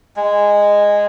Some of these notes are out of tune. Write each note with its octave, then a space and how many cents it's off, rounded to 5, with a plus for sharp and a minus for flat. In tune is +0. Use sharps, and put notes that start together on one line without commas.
G#3 -10